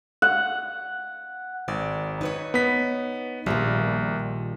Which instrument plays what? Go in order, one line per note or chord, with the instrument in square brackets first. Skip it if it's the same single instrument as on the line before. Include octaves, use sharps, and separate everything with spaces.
[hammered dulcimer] F#5
[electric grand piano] G#1 [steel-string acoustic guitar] D5
[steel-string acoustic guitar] D#4 B4 C#5
[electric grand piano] B3 B6
[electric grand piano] A#1 [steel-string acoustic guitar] A#2 D#3 G3